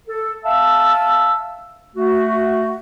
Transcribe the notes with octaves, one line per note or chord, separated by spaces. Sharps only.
A4
E5 F5 A5 E6
A3 F#4